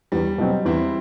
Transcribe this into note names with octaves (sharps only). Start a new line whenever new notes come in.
E2 G3
B2 F#3 C4
E2 C4 E4